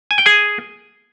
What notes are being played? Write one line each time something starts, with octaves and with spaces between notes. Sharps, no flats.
G#5
G5
G#4 G#5